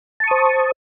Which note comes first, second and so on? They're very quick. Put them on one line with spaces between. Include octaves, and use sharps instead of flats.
A5 C#6 D#6 C5